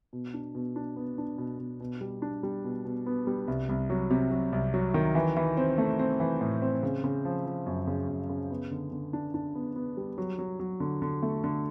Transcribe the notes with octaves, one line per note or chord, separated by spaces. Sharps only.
B2
D4
B2
D4
B3
D4
B2
B2
B2
G3
D4
G3
B2
B2
B3
G3
C2
C2
F#3
C3
F#3
C2
F#3
D#3
E3
E3
C4
A3
C4
E3
A2
C4
C#3
C#3
F3
F3
F#2
C#3
F#2
C#3
B3
D3
D3
D4
D4
B3
B3
G3
F#3
F#3
F#3
D3
D3
A3
D3